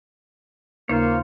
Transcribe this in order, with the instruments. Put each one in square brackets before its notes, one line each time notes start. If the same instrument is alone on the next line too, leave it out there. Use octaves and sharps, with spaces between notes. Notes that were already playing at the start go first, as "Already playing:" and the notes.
[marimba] D#2 C#3 D#4 [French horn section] A#3 [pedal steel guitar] F4 C5 C#5